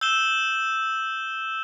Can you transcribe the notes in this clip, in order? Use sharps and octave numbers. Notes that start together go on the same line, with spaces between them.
E6 G6 E7 G7